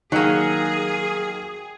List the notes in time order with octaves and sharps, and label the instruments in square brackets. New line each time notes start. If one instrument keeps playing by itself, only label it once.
[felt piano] D#3 [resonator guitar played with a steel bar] F#3 A#3 [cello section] G#4